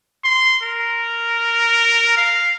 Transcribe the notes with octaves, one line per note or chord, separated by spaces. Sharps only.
C6
A#4
F5